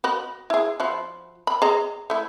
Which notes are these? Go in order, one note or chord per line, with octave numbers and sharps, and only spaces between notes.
F#4 D#5 B5
E4 G#4
F3 E4 F#4
B5
G#4 D#5 A#5
A3 E4